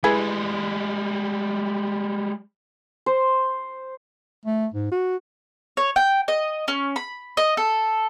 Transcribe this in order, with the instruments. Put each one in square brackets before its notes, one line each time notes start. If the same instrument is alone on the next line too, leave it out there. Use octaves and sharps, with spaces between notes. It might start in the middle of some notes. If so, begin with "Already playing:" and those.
[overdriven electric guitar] G3 G#3 [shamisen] E4 G#4 B4
[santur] C5
[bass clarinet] A3
G#2
F#4
[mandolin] C#5
G5
D#5
C#4
B5
D#5
A4